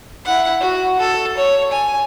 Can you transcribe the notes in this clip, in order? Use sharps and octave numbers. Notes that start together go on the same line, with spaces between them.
E4 F#5
F#4
A4
C#5
G#5